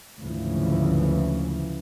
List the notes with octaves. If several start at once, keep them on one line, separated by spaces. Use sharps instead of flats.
D2 G#2 C#3 E3 F3